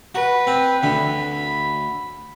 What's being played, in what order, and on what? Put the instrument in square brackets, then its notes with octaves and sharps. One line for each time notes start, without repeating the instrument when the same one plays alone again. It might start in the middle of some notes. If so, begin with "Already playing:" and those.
[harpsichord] F#4 [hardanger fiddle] B4
[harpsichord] C4
[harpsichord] D2 D3 [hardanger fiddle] B5